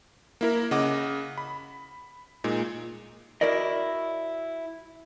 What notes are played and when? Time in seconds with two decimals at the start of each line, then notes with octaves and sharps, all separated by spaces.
0.41 A#3 E4 A#4
0.71 C#3 D#5 F#5 D6
1.38 B5
2.44 A#2 G#3 D#4
3.41 E4 F#4 A#4 D5 D#5